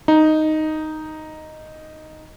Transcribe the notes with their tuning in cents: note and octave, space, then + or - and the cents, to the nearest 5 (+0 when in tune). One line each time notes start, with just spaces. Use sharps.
D#4 +0